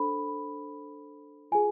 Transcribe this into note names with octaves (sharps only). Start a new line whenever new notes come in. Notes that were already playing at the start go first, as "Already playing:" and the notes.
Already playing: D4 A4 C5 B5
F4 G#4 G#5